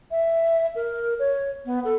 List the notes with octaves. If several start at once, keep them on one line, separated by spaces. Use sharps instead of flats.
E5
A#4
C#5
B3
A4